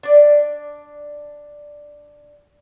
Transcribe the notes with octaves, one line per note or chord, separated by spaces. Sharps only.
D4 D5